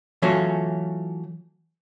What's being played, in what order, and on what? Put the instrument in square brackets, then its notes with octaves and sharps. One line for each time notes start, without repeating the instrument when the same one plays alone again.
[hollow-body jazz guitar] E3 F#3 A3 C#4 F4 F#4